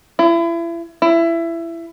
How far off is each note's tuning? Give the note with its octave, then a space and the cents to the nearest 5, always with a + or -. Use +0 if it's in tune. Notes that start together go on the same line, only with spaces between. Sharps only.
E4 +35
E4 +20